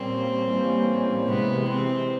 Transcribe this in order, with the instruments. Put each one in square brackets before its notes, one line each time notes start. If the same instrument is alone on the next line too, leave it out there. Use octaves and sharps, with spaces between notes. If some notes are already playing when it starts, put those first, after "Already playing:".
Already playing: [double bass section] A#2 G3 A#3 C#4 [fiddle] C4
[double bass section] A2 E3 G3 A#3 C#4
[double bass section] C3 E3 G#3 [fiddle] B3
[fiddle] C4